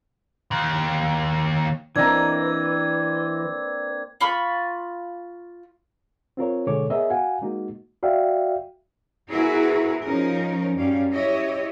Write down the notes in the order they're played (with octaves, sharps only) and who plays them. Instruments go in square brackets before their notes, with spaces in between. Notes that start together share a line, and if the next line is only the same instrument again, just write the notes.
[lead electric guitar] D#2
[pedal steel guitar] E3 D#5 [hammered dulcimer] A#3 C4 D4 [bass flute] B4 [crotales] G#6
[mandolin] F4 B5 C#6
[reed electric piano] C4 F4 A#4 C#5
B2 D3 G#3 A4 C#5 D6
B3 G#4 A#4 C#5 D#5 E5
F#4 F5 F#5 G#5
G#3 A#3 D#4 F#4
[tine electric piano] F#4 D5 E5 F5 G5
[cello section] B3 E4 F#4 G#4 A#4 B4
F3 C#4 D#4 A#4
F#2 G3 C#4 F5
E4 G4 C#5 D#5